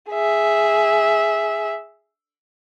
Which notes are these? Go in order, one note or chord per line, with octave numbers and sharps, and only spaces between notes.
G#4 E5